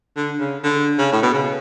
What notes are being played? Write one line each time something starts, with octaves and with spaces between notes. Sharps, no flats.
D3
C#3
D3
C#3
A2
B2
C#3